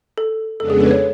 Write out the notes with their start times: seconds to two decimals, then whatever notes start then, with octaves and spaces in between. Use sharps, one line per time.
0.18 A4
0.59 F2 C#3 G#3 B3 D4 A4
0.70 G#4
0.80 A4
0.86 B4
0.91 C#5